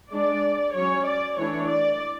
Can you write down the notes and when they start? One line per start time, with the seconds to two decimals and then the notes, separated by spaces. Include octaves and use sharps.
0.12 G#3 D4 D5
0.75 F#3 C#4 C#5
1.06 D5
1.39 E3 A3 D4 C#5
1.70 D5